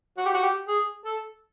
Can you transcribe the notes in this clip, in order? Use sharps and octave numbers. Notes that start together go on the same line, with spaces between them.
F#4
G4
F#4
G4
G#4
A4